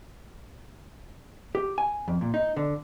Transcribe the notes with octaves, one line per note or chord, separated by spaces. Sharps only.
G4
G#5
F2
A#2
D#4
D3